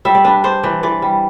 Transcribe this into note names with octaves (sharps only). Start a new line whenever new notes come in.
G3 E5
D5
D4 B4
D4 C5
E3 D5
E3 D5
G3